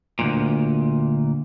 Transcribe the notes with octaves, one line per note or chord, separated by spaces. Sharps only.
D2 G2 A#2